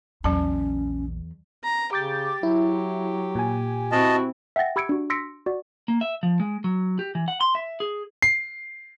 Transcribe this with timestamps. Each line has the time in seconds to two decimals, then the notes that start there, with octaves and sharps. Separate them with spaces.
0.24 A#1 E2 F#3 C#4 A5
1.64 A#5
1.93 C#3 G4 D6 G6 A6
2.43 F#3 E4
3.35 A#2 G#5
3.92 C4 E4 F#4 D#5 A5
4.56 E5 F#5 G5 A6 A#6
4.76 G4 B5 E6 G#6 C#7 D7
4.89 D4 F#4
5.10 C6 E6 A#6 B6 C#7 D7
5.46 F#4 D5
5.88 A#3
6.01 E5
6.23 F3
6.40 G#3
6.64 F#3
6.99 G4
7.15 E3
7.28 F#5
7.41 C6
7.55 E5
7.80 G#4
8.22 C7